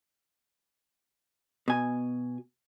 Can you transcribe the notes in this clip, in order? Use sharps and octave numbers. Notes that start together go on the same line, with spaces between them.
B2 G#5